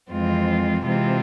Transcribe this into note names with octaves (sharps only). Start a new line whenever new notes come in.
F2 E3 G#3 C4 F4
C3 E3 G#3 C4 F4